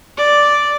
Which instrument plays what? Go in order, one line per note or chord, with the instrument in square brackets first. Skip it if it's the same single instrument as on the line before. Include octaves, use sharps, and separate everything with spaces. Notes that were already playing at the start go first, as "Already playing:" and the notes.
[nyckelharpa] D5